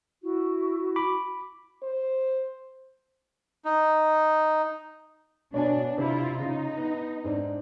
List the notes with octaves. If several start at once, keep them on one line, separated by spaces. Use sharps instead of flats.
E4 F#4
B5 D6
C5
D#4
B2 D4 C#5 D5 G#5
C3 E4 F4
C#3 D#4
B3
G#2 C4 D4